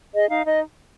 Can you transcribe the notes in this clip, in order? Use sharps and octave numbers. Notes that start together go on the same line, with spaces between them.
G#4 D#5
D#4 F5
D#4 D#5